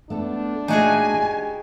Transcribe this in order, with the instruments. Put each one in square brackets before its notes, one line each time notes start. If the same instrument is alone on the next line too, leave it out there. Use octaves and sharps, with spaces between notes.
[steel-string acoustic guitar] A3 B3 A4 [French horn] D4
[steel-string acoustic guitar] A#2 A3 G5 [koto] D#4 F#4 G#4 [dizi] G#5
[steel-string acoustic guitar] G4